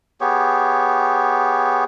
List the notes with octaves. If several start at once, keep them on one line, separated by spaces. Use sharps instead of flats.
B3 G4 G#4 C#5